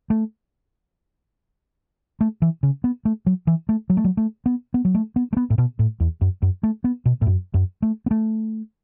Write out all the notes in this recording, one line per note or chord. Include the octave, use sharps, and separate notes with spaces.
A3
A3
E3
C#3
B3
A3
F#3
E3
A3
F#3
A3
F#3
A3
B3
B3
F#3
A3
B3
A3
B3
A2
B2
A2
E2
F#2
F#2
A3
B3
B2
A2
F#2
F#2
A3
B3
A3